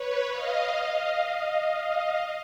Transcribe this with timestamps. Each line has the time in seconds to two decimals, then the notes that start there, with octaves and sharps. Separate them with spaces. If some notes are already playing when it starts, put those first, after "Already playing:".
Already playing: B4 C#5
0.33 D#5 F5